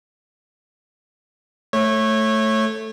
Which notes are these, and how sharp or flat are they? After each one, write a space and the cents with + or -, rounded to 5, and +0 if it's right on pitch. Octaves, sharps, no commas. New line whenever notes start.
A3 +0 C#5 -20